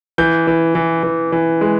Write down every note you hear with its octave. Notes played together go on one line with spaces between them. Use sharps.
E3 G6
E3
E3
E3
E3
G#3